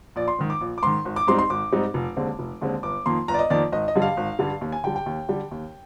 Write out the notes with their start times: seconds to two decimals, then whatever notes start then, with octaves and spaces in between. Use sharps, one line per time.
0.16 A#1 D5
0.28 C6
0.39 G#2 D#3
0.50 D6
0.61 A#1
0.78 D6
0.83 G#2 D#3 C6
1.05 G#1
1.16 D6
1.27 G#2 G3 C4 D#4 C6
1.39 C6
1.50 G#1 D6
1.72 G#2 G3 C4 D#4
1.94 F1
2.17 D#2 D3 G#3 C4
2.39 F1
2.61 D#2 D3 G#3 C4
2.83 G1 D6
3.06 F2 D#3 A#3 C6
3.28 G1 A#5
3.34 D5
3.39 D#5
3.50 F2 D#3 A#3 D5
3.72 G#1 D#5
3.88 D#5
3.95 G2 D3 G3
4.02 F5
4.17 G#1
4.39 G2 D3 G3
4.61 D#2
4.72 G#5
4.84 D3 G5
4.87 G3
4.96 G5
5.06 D#2
5.29 D3 G3
5.51 D#2